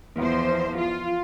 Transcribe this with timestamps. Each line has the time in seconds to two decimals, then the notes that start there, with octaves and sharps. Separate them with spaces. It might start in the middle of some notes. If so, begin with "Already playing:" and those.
0.17 E2 F3 C5
0.77 F4